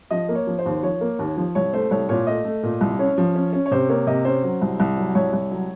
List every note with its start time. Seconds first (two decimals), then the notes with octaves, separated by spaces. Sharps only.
0.11 F3 D#5
0.29 A#3
0.35 C#5
0.47 F3
0.59 C5
0.66 D#2
0.83 F3 C#5
1.01 A#3
1.19 D#2
1.37 F3
1.55 C2 C#5
1.73 A3 C5
1.91 C2 C#5
2.09 A#2 C#5
2.27 A3 D#5
2.45 A3
2.63 A#2
2.81 C2
2.99 C#4 C#5
3.18 F3
3.35 C#4
3.53 C#4
3.66 C#5
3.71 C3 C5
3.89 A#3 C#5
4.07 C3 D#5
4.25 C#4 C5
4.43 F#3
4.61 C2
4.80 C2
4.97 F#3
5.15 C2 C#5
5.33 C2
5.51 F#3